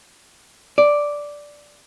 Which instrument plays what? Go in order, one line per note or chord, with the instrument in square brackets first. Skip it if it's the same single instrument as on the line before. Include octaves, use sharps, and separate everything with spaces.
[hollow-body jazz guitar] D5